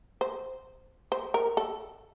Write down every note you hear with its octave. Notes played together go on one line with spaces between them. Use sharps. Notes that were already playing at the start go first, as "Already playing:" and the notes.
C5
C5
A#4
A4